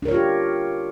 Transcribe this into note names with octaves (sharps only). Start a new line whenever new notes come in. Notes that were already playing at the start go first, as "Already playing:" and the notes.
D4 F4 G4 A#4 C#5